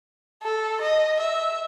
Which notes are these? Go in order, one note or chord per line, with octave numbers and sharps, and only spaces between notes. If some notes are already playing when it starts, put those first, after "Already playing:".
A4
D#5
E5